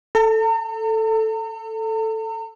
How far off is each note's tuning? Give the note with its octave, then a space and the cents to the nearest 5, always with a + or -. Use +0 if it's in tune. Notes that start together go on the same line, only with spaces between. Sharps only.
A4 +0 A#5 -45